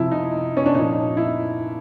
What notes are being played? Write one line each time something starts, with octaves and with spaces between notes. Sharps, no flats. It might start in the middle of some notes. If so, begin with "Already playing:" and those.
Already playing: C3 F3 E4
D#4
C#4
D4
A#2 F3 D#4
E4